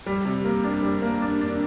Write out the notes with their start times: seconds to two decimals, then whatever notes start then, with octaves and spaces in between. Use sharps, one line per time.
0.06 G3
0.25 C3
0.44 A#3
0.64 D4
0.83 G3
1.02 A#3
1.22 D4
1.41 D4